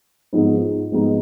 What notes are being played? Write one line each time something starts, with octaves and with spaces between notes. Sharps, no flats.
G#2 F3 G#3 B3 D#4
G#2 F3 G#3 B3 D#4